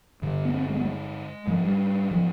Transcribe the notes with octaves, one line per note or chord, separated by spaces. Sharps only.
G2 D3
B3
C4
G#3
B3
G#3
G#2 F3
G3
F3